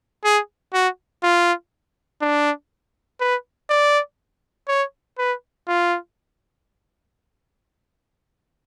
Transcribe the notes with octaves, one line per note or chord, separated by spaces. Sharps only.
G#4
F#4
F4
D4
B4
D5
C#5
B4
F4